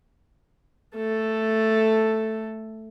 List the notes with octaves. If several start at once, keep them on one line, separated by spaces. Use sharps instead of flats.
A3 A4